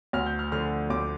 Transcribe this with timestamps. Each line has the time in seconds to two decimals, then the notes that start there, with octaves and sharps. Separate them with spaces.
0.13 D2 F6
0.26 G6
0.39 F6
0.52 D3 F3 F6
0.90 D2 D6